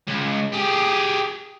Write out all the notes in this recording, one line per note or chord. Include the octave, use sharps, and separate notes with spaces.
C#2
G4 G#4